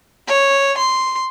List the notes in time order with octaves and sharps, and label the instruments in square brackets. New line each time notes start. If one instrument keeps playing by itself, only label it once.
[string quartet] C#5
C6